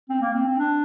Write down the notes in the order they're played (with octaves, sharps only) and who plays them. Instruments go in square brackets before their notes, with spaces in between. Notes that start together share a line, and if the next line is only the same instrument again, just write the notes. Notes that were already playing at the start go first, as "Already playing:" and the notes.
[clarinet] C4
A#3
C4
C4
D4